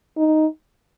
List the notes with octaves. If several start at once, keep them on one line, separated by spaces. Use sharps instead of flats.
D#4